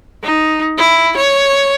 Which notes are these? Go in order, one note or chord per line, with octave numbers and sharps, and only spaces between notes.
D#4
E4
C#5